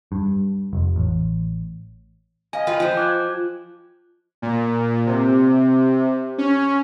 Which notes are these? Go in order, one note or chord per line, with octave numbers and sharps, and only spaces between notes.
G2
F1
A1
D#5 F5 G#5
F4 B4 G5 G#5
F3 C5
D6 F#6 G#6
A#2
C3
C#4